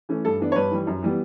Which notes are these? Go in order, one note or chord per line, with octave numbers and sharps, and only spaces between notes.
E3 A3 C#4
G2 A4
E3 B3 D4
C#5
G2 B4
E3 G3
F#2
E3 G3 B3